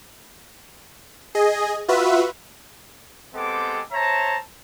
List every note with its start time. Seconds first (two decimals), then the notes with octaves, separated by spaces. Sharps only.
1.35 G#4 D#5
1.88 F4 F#4 B4 E5
3.35 G#3 B3 C4 G4 A4 D6
3.92 C5 C#5 E5 A5 A#5